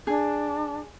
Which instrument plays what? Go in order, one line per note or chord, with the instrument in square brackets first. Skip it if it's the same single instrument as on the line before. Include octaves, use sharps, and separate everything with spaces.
[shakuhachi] D4 [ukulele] G#4